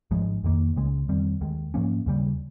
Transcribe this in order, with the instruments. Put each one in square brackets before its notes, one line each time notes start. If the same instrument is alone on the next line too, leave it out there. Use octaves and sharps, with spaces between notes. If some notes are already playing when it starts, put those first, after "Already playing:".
[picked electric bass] G#1 G#2 F3 G#3
F2 D#3 A#3
C#2 C#3 G#3
F2 D#3 G3 C4
D#2 D#3 G#3
G#2 F3 A#3 C#4
D#2 C#3 G3